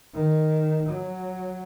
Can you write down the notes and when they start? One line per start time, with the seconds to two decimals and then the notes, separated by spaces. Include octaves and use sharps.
0.14 D#3
0.89 F#3